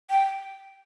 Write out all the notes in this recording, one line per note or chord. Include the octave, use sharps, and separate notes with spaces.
G5